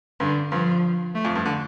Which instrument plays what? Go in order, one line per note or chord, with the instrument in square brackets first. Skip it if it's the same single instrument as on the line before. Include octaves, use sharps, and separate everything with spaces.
[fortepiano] G2 [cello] D3
[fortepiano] G2 [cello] F3
[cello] A3
[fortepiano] F2
G2
D3